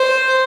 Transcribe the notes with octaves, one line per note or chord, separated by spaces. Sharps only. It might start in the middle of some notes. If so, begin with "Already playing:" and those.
Already playing: C5